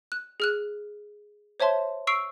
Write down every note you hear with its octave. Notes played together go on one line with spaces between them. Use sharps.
F#6
G#4 F6 F#6
C5 C#5 E5 A5 C6
C#6 E6 C7 D7